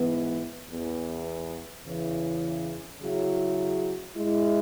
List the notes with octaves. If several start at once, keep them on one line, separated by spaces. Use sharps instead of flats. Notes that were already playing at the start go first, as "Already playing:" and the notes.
Already playing: G#2 E3 B3
E2 E3 B3
E2 C#3 E3
C#3 F#3 E4 G#4
G#2 G#3 E4